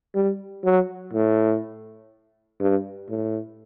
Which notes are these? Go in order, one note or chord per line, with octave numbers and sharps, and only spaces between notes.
G3
F#3
A2
G2
A2